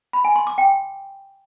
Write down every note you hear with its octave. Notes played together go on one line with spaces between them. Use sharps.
B5
G#5
C6
D6
G5